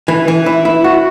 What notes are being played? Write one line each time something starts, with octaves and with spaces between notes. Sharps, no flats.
E3
E3
E4
E4
F#4